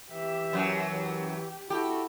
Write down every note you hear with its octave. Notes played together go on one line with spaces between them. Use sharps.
E3 G4 E5
F#2 F#3
E3 G4
E4 F#4 G4 A4